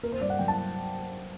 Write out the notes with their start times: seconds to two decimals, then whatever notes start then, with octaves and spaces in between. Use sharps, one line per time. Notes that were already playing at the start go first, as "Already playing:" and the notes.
0.03 A#3 A#4
0.12 C5
0.21 G2 D5
0.30 F#5
0.39 F#3 G5
0.48 A5